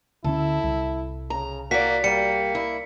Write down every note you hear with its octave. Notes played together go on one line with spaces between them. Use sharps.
D2 D3 C#4 E4 A4
C2
C#3 A#5
A#3 F#4 D5 B6
G3 A#3 C#7
E4